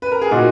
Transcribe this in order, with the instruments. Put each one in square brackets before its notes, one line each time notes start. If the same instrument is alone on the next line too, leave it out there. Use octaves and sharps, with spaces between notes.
[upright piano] B4
A#4
G#4
A#2 D#4 F#4